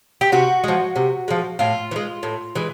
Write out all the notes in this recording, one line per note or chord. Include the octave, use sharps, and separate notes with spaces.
G4
C3 F#4
F3 G#3
C3
F3 G#3
A2 F4
E3
G#3
A2
E3 G#3